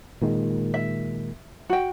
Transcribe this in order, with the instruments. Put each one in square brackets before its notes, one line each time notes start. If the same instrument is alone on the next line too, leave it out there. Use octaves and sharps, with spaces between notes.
[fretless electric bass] A#2 D#3 G#3
[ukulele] E5
F#4 G5